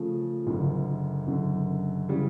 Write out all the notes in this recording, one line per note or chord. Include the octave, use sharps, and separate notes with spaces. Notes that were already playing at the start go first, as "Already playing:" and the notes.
Already playing: C#3 F3 A3
F#1 F#2 D3
F#1 F#2 D3
C#3 E3 G3